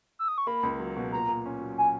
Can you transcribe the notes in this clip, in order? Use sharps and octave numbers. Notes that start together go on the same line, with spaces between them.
E6
D#6
C#6
A#3 B5
C#2
F#3
B2
A#2 A#5
A#2
C#4
F#3
G#5